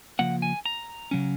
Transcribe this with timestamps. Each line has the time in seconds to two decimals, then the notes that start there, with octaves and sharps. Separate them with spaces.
0.19 C#3 F3 A#3 F#5
0.42 G#5
0.66 A#5
1.11 C#3 F#3 C#4